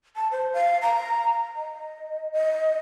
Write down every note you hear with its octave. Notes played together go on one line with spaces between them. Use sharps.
A5
C5
F5
A#5
D#5
D#5